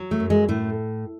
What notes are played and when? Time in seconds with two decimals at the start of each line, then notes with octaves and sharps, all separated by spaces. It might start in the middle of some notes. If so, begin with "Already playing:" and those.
Already playing: F#3
0.11 A3
0.20 F#2
0.30 G#3
0.49 A2 A3